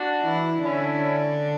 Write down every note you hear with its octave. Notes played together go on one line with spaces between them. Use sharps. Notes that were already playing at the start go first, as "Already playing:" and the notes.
Already playing: D4 F#4
E3 E4
D3 C#4 D4 E4